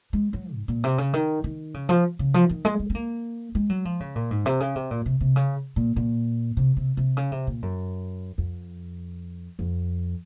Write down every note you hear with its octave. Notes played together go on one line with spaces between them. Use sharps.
G#3
F#3
G#2
A#2
C3
C#3
D#3
D#3
C#3
F3
C#3
F3
D#3
G#3
G#3
C4
A#3
G#3
F#3
F3
C#3
A#2
G#2
C3
C#3
C3
A#2
C3
C3
C#3
A#2
A#2
C3
C3
C3
C#3
C3
A#2
F#2
F2
F2